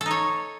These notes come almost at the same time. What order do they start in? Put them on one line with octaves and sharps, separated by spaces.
A4 D#4 C#5